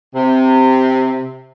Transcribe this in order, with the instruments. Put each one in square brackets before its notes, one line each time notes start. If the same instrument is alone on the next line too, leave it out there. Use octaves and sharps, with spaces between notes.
[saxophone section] C3